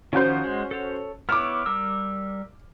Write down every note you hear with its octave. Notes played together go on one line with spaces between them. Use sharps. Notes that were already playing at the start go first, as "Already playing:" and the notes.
D#3 F3 C#4 F#4 C5 G6
G#3
A4 C#5
B3 E4 C#5 D6 F6
G3 A#4 E6